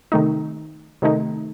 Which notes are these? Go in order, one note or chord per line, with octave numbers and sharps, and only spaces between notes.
C3 D#3 A3 D#4
C3 D#3 A3 D#4